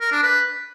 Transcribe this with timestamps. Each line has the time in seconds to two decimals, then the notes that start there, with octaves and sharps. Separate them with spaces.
0.01 A#4
0.12 D4
0.23 B4